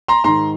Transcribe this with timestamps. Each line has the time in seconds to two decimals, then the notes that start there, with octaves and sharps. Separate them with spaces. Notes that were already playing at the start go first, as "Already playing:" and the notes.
0.08 A#5 C6
0.24 G#2 D#3 A#5 C6